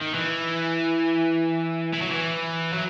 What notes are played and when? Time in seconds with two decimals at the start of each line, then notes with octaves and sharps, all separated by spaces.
0.01 D#3
0.14 E3
1.94 E3
2.01 F#3
2.10 E3
2.73 F#3